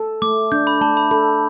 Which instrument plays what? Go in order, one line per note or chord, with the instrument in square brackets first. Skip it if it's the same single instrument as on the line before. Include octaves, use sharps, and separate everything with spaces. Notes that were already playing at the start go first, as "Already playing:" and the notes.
Already playing: [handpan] A4
[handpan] A3 [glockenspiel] D6
[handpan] D4 [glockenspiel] G6
[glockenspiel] B5
[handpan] A3 [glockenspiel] A5
[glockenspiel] B5
[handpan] A4 [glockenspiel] B5